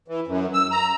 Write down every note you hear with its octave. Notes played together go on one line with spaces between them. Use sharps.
E3
F#2
E6
A#5